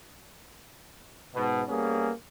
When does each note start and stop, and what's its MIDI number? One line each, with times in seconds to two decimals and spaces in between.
1.35 1.62 44
1.35 1.62 47
1.68 2.11 55
1.68 2.11 58
1.68 2.11 59
1.68 2.11 61
1.68 2.11 68